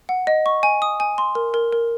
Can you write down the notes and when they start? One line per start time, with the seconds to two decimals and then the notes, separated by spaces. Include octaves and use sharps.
0.09 F#5
0.27 D#5
0.46 C#6
0.63 G#5
0.82 D#6
1.00 G#5
1.18 C6
1.35 A#4
1.54 A#4
1.73 A#4